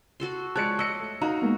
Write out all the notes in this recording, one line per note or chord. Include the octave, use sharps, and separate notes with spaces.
F#4 A4 C6
F3 G#3 C#5 D5 A5 F#6 C#7
D#5 E6 C#7
A3
D#4 F#4 F5 A#5
G#3 A#3 B3